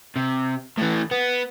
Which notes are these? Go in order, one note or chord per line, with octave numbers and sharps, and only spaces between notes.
C3
A2 E3
B3